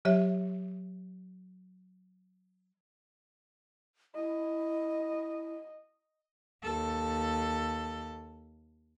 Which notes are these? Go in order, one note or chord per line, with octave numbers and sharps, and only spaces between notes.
F#3 G4 C#5 E5
E4 D#5
D#2 A4